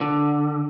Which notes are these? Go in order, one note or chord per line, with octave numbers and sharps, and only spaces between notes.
D3